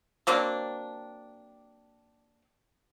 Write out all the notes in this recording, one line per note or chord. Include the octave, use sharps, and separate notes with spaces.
F#3 A#3 C4 D4